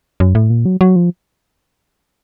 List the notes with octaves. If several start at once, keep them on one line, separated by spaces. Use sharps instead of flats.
F#2
A2
A#2
F#3
F#3
F3